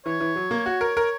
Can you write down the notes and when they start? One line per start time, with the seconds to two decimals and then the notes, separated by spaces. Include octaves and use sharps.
0.06 E3 C#5
0.20 E3
0.36 F#3
0.51 A#3
0.66 F#4
0.81 A#4
0.97 A#4